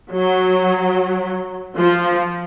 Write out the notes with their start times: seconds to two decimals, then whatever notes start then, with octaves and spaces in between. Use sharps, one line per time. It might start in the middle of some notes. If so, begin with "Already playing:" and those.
0.11 F#3
1.76 F3